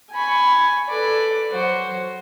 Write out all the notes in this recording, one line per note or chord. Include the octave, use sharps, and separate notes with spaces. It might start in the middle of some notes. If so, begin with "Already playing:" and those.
G#5 B5 C#6
A4 B4 D5
F#3 F#4 C5